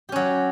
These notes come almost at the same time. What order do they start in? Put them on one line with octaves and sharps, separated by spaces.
G4 C#4 F#3